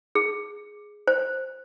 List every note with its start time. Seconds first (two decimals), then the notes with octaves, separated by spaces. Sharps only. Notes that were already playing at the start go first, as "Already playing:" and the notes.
0.15 G#4
1.08 C5